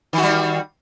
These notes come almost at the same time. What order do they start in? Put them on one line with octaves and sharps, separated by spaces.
D#3 F#4 G3